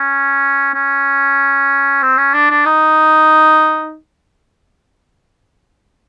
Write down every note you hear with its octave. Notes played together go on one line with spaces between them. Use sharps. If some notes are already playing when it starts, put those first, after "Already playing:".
Already playing: C#4
C#4
C4
C#4
D4
D4
D#4